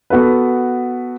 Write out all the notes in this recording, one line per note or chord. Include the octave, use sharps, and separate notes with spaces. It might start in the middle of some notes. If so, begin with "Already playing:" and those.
B3 F#4 A4 B4